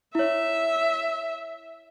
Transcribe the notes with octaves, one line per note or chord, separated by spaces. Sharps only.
E4 C#5 E5